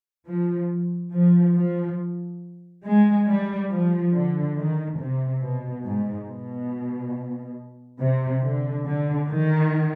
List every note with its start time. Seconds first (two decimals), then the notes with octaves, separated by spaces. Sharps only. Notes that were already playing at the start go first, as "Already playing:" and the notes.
0.28 F3
1.14 F3
1.56 F3
2.85 G#3
3.28 G3
3.70 F3
4.14 D3
4.57 D#3
4.99 C3
5.42 B2
5.85 G#2
6.28 B2
8.00 C3
8.42 D3
8.85 D3
9.28 D#3